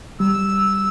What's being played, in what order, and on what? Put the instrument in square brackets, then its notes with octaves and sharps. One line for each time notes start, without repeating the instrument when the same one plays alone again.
[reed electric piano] G3 [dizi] E6